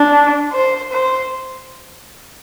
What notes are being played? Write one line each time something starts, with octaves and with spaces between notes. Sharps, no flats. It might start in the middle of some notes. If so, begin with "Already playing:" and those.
Already playing: D4
C5
C5